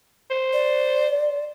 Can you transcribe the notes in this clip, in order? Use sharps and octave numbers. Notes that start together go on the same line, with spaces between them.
C5
D5